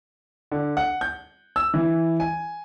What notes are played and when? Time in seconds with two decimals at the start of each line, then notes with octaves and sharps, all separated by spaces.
0.52 D3
0.77 F#5
1.01 G6
1.56 E6
1.74 E3
2.20 G#5